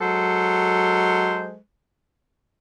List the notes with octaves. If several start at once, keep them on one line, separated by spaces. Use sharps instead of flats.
F#3 G#3 A4 C5